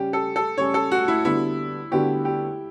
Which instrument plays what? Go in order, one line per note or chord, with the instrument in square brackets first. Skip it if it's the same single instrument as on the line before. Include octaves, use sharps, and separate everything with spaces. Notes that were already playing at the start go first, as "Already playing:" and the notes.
Already playing: [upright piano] C#3 G3 C#4 [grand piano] G4
[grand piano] A4
A4
[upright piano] C#3 G3 C#4 [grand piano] C#5
[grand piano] A4
F#4
E4
[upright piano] D3 G3 B3 F#4 [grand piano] E4
[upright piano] D3 G3 B3 F#4 [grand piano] G4
[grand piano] G4